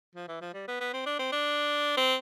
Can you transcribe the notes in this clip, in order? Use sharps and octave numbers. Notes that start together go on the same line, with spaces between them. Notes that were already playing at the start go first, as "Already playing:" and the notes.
F3
E3
F3
G3
B3
B3
C4
D4
C4
D4
C4